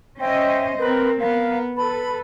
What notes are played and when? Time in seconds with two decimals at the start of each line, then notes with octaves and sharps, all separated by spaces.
0.20 C#4 C5 D#5 E5 G5
0.79 C4 A#4 B4
1.20 B3 A#4 F5
1.77 A4 B4 B5